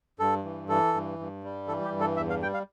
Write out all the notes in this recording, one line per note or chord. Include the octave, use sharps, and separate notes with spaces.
G2 A4
E3
E3 A4
G2
G2
G3
E3 A4
G4
G2
A4
E2 E5
F5
G3 G5
F5